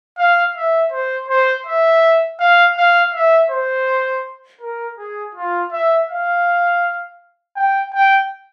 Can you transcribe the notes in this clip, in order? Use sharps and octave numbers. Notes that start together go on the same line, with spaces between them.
F5
E5
C5
C5
E5
F5
F5
E5
C5
A#4
G#4
F4
E5
F5
G5
G5